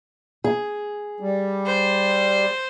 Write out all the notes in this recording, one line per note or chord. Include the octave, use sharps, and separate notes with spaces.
G#4
G3
C5